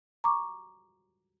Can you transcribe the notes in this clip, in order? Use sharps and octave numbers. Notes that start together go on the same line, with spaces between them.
A#5 C#6 D6